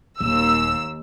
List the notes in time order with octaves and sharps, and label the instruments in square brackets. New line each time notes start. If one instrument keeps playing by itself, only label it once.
[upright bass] D#1 [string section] D#2 E6